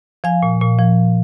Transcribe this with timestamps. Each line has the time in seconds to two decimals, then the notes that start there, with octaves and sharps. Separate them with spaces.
0.24 F3 F5 G#5
0.43 A#2
0.61 A#2
0.79 F3